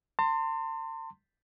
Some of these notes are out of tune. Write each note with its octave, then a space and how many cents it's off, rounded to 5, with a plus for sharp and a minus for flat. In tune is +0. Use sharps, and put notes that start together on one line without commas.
A5 +45 C6 +0